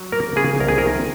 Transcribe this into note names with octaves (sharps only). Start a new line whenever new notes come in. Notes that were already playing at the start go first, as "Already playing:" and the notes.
Already playing: F#3
A#3 A#4
C#3 G#4
C2 A#4
G#4
A#4
D#3